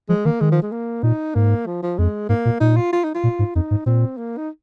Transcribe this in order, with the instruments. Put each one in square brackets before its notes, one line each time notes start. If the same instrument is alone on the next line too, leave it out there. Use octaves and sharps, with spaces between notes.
[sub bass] F3 [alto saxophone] G#3
[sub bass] D#3 [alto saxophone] A#3
[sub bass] D#3 [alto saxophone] G#3
[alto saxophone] F3
G#3
A#3
[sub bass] A#2 [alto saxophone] D#4
[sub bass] G#2 [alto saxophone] A#3
[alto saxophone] F3
F3
[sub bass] F2 [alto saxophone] G#3
[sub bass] G#2 [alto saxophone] A#3
[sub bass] A#2
[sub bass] A#2 [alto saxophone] D#4
[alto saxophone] F4
F4
D#4
F4
[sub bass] A#2
G#2
[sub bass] F2 [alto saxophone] D#4
[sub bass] G#2
[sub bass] A#2 [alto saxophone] C4
[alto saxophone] A#3
D#4